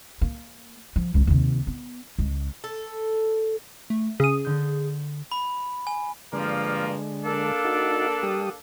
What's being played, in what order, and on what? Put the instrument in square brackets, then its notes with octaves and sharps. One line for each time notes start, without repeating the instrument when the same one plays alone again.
[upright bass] A#3
F3
C#2 D#3
D#2 C3
B3
C#2 G#3
[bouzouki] A4
[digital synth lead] A3
[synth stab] C#3 D#6 [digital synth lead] G#4
[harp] D3 G6
[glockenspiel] B5
G#5
[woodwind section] G2 F3 A#3 [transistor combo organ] D3 G#3
[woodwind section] A#3 D4 A4
[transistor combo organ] D#4 F#4
G3 G4 D#6